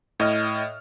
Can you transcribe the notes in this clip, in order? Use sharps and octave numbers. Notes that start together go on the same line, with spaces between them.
A2 D#5 F6